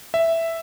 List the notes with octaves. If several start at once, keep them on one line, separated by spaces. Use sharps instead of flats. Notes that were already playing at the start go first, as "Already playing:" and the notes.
E5